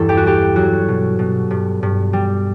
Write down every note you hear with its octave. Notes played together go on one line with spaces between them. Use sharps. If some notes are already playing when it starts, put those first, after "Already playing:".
Already playing: E2 G2 A4
G4
F#4
G3 G4
F#3 F#4
B2
B2
G2
G2
G3